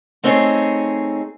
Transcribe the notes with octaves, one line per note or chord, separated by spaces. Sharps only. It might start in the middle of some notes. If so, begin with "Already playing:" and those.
A3 C4 D#4 G#4 C#5